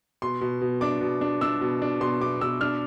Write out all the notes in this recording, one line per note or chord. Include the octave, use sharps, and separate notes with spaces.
B2 C6
B2
B2
D4 D6
B2
D4
D4 E6
B2
D4
B2 C6
B2 D6
B2 E6
D4 F6